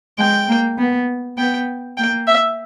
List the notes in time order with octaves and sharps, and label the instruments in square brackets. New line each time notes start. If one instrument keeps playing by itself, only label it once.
[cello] G#3 [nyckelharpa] G5
[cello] A#3
B3
[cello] B3 [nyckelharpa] G5
[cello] A#3 [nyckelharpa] G5
[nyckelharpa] E5